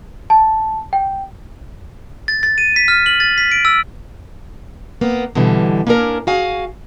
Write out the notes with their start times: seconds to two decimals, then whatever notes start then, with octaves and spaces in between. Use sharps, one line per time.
0.30 A5
0.93 G5
2.28 A6
2.43 A6
2.58 D#7
2.76 B6
2.88 F6
3.06 F#7
3.20 A6
3.38 B6
3.51 D7
3.65 E6
5.01 A#3 B3
5.35 B2 D3 E3 G3
5.87 A#3 C#4 D4 G4 A#4
6.27 F#4 G#4 F5 G#5